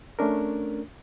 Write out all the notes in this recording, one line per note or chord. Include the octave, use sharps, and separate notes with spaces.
A3 C#4 D4 A#4